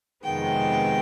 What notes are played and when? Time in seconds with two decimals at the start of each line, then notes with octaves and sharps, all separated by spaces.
0.24 F2 C3 D#3 G#3 B3 G5